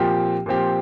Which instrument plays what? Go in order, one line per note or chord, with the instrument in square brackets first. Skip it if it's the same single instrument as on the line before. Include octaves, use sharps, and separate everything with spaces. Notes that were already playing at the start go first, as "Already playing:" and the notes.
Already playing: [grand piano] A#2 F3 C4 G4
A#2 F3 C4 G4